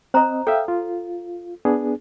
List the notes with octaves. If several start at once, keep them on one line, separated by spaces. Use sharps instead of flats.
C4 C5 D#5 A#5
A4 E5 F5 G5
F4
B3 D4 G#4